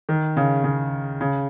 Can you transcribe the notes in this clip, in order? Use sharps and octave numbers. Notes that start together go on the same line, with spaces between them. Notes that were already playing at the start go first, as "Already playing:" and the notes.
D#3
C#3
C#3
C#3